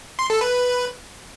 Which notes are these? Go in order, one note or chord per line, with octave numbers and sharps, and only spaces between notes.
C6
A4
B4